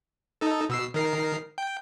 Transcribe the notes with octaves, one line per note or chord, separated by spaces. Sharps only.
D#4 A4
B2 E6 C7
D#3 A#4 C7
G5